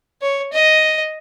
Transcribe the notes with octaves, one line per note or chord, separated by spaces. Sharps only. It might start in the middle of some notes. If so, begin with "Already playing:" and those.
C#5
D#5